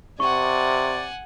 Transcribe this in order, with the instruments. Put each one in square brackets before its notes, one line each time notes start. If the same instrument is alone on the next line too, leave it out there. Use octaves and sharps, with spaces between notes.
[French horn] C3 [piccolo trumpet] D5 [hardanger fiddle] F#5 G#5 [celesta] C#6